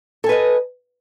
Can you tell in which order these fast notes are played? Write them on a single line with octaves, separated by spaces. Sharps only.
A4 G#5 B4 D#5